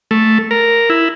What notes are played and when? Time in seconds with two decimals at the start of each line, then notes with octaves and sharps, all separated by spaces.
0.11 A3
0.51 A#4
0.90 E4